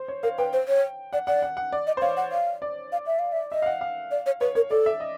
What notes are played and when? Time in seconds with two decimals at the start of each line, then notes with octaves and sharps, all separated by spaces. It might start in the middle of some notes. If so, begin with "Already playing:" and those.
Already playing: C5
0.08 C#5
0.23 A#4 F5
0.38 B4 G5
0.53 C5
0.68 C#5
1.13 D5 F#5
1.27 D5 F#5
1.42 F#5
1.57 F#5
1.72 D5
1.87 D#5
1.97 C5
2.01 C#5 F5
2.17 F#5
2.32 F5
2.62 D5
2.92 F5
3.07 E5
3.19 F5
3.32 E5
3.52 D#5 E5
3.62 F5
3.66 F#5
3.81 F5
4.11 D5
4.26 C#5
4.41 B4 C#5
4.55 A#4 C#5
4.71 A4 D5
4.86 E5
5.00 D#5